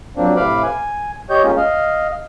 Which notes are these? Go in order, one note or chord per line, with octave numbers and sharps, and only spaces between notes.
F3 F#3 A#3 C4 D4
A2 C3 B4 F5 B5 D6
G#5
G4 C#5 D#5 G6
G#3 A#3 C#4 F4
D#5 F5